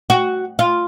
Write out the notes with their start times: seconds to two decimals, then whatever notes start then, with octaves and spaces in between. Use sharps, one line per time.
0.10 F#4
0.59 F4